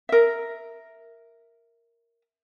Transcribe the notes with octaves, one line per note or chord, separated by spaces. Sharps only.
A#4 E5